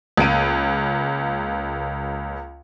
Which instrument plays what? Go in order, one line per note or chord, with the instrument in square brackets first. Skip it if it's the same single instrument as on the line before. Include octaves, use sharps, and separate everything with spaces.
[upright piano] C#2 A#3 D7 D#7